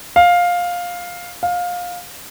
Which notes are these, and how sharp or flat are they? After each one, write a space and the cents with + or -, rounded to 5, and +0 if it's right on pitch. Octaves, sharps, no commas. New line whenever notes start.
F5 +10
F5 +20